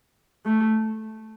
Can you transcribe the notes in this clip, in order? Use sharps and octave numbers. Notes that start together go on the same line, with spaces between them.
A3